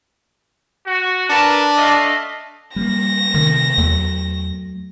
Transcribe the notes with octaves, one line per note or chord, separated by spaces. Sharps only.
F#4
D4 A#4 B4 A5
A3 D#5 F5
G3 A3 A#3 A#6
C3 D#3 A3
E2 F#3 A3